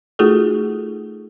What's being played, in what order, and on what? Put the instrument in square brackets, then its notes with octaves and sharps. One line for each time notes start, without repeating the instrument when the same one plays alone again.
[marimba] A3 D#4 F4 F#4 G#4 A4